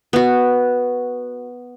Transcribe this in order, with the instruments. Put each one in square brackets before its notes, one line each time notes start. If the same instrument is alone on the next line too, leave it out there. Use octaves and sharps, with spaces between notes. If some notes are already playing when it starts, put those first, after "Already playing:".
[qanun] B3 F#4